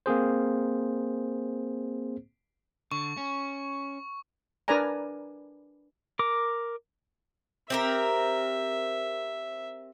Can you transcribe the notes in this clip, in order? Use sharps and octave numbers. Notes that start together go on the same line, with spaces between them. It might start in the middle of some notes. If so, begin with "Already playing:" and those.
A#3 C4 G#4 C5
D3 C#6
C#4
D4 A#4 B4 D5 G#5 A#5
A#4 D6
C4 G4 A#4 E5